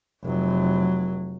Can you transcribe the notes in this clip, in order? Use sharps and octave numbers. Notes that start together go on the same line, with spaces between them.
F1 F#3